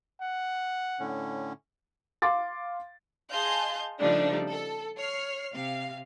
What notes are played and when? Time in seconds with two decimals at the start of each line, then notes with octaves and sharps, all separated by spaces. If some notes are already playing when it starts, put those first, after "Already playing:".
0.21 F#5
1.00 A2 D3 C#4
2.22 F5 C6 D6 A6
3.31 G#4 D#5 F5 A5 C6 G6
4.01 C#3 F3 G3 A3 D4 D#4
4.50 A4
4.96 C#5 F6 C7
5.53 C3 F5